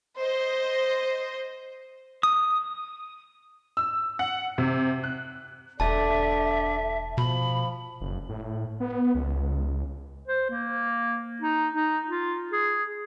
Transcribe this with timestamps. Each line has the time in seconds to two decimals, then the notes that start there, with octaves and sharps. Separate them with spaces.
0.18 C5 D#5
2.23 D#6
3.77 E6
4.19 F#5
4.58 C3
5.04 F#6
5.80 E1 D3 D5 E5 A5
7.18 B2 F3 B5
8.01 F#1
8.29 A2
8.80 B3
9.14 C#2
10.28 C5
10.50 A#3
11.42 D#4
11.75 D#4
12.08 F4
12.52 G#4